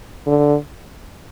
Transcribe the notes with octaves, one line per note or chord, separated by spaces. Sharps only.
D3